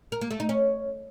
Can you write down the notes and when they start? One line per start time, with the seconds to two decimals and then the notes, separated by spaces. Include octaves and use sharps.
0.12 A#4
0.21 A#3
0.31 A3
0.40 D#4
0.49 C#4